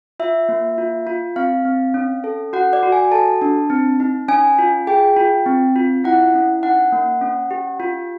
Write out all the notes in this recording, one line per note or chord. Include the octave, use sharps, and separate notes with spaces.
F4 E5
A#3
F4
F4
C4 F5
C4
C#4
A4
F#4 F#5
D5
F#4
G#5
A4 A5
D4
C4
D#4
C#4 G#5
F4
G#4 G5
F4
C4
F4
E4 F#5
C#4
D#4 F#5
A#3
C#4
G4
F4